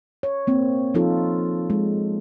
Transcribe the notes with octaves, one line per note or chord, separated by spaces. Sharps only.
C#5
A#3 C4
F3 D#4 F4 A4
G#3